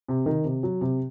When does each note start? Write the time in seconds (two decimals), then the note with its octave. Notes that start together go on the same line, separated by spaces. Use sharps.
0.08 C3
0.26 D#3
0.44 C3
0.63 F#3
0.81 C3